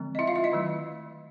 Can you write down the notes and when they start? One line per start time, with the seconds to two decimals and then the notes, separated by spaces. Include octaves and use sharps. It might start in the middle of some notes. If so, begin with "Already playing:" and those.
Already playing: D3 F3 G#3 C4
0.15 D#5
0.19 E4 E5
0.27 F4 F5
0.36 E4 E5
0.44 D#4 D#5
0.52 D#3 F#3 A3